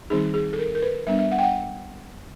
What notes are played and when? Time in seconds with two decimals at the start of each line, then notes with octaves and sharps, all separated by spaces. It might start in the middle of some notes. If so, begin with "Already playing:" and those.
0.10 D#3 G3 C4 D#4 G#4
0.34 G#4
0.53 A4
0.59 A#4
0.75 A#4
0.82 B4
1.07 G3 B3 D4 E5
1.19 E5
1.31 F#5
1.38 G5
1.43 F#5